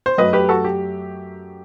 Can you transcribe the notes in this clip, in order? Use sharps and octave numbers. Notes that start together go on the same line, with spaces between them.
C5
F#2 F#3 A3 B4 D#5
G4 B4
F#4 A4
G4